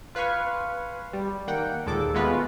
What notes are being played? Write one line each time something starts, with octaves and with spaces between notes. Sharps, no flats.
F4 B4 F5 G#5 C#6
G3
D#3 A#3 F#5 G5
D#2 A#2 G#3 A4 D6
G#3 A3 B3 F4 F#4 B4